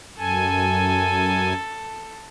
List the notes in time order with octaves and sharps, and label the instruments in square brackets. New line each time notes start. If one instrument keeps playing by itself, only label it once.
[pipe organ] F#2 G#5 [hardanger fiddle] A4